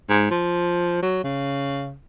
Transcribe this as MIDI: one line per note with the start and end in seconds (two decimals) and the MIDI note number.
0.09 0.26 44
0.30 1.00 53
1.02 1.20 54
1.24 1.95 49